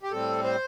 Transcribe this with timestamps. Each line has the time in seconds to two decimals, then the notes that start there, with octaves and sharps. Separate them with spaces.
0.03 G4
0.11 A2 G3 C4 A4
0.44 C5